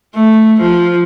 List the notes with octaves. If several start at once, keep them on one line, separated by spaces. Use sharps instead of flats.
A3
F3